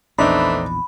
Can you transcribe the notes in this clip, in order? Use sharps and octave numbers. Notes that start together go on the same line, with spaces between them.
A#1 E2 E3 A3 C4 D4 D#4 B5